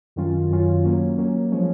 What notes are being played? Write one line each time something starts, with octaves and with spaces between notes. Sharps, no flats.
F#2 D#3 F#3 C#4 F4
F#2 D#3 F#3 C#4 F4
F#3 A#3 C#4
F#3 A#3 C#4
F3 G#3 C#4